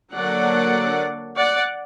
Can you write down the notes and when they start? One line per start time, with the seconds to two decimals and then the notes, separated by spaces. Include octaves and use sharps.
0.13 D3 F#3 A#3 D4 D5 F#5
1.37 D5 F#5